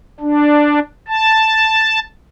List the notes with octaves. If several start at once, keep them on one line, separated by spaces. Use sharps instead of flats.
D4
A5